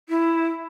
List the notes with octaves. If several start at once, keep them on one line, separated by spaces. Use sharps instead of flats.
E4